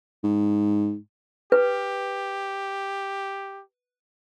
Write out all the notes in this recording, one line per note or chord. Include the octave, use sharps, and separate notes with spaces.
G#2
G4 B4